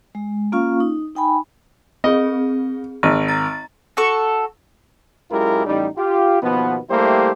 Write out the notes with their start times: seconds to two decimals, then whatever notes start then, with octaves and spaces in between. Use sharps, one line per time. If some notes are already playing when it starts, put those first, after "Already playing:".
0.15 G#3
0.52 A#3 C#4 F4 F5 C#6
0.80 D#4
1.16 D#4 G5 G#5 B5
2.04 C4 G#4 D#5
3.03 G#1 D#7
3.28 A#5 A6
3.97 F#4 A4 C#6
5.31 F#2 G#3 E4 F4 G4 A#4
5.66 A1 G3 D#4
5.96 F4 G4
6.42 D#2 B2 F3 B3
6.90 G3 A3 A#3 E4 G4 C5